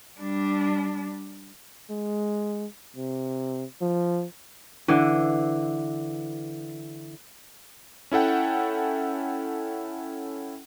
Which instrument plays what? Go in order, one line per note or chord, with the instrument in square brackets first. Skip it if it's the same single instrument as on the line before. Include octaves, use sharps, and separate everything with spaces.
[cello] G3 D4
[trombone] G#3
C3
F3
[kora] D3 E3
[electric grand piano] C#4 E4 A4 F#5 G5